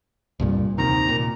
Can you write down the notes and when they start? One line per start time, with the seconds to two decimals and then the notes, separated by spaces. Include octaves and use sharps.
0.40 C2 G2 A#2
0.78 D#2 C3 D#3 A#5
1.08 A#2